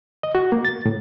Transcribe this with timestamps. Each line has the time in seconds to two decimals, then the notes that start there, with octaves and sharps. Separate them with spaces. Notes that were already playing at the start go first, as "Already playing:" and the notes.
0.23 D#5
0.35 F#4
0.52 A#3
0.65 A6
0.86 A2